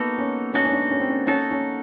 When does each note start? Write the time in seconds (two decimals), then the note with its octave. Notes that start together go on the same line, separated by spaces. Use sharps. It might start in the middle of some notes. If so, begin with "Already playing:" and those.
Already playing: A#3 B3 D#4 F#4 A4
0.18 C#4
0.54 A#3 C#4 D#4 F#4 A4
0.65 C#4
0.73 D4
0.91 C#4
1.00 C4
1.09 C#4
1.27 A#3 C#4 D#4 F#4 A4
1.51 C#4